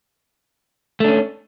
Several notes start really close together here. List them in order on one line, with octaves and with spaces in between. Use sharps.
A3 D4 C#4